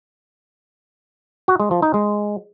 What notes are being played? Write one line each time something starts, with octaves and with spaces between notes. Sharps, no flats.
F#4
G#3
F3
D#4
G#3